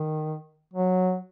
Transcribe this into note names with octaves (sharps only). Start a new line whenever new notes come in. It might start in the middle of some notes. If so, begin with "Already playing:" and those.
Already playing: D#3
F#3